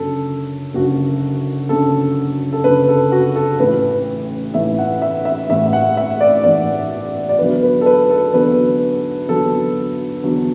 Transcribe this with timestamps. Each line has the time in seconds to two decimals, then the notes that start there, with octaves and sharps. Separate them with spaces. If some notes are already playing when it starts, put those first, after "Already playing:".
Already playing: F#1 F#2 D3 A4
0.74 F#1 F#2 D3 F#4
1.69 F#1 F#2 D3 A4
2.53 A4
2.64 F#1 F#2 D3 B4
2.89 A4
3.12 F#4
3.36 A4
3.60 A1 A2 E3 B4
4.54 A1 A2 E3 E5
4.79 F#5
5.02 E5
5.25 E5
5.50 A1 A2 E3 E5
5.66 E5
5.73 F#5
5.97 E5
6.21 D5
6.44 A1 A2 E3 D5
7.29 D5
7.39 E2 D3 F#3 B4
7.63 B4
7.81 A4
7.86 B4
8.10 A4
8.33 E2 D3 F#3 B4
9.28 E2 D3 F#3 A4
10.24 E2 D3 F#3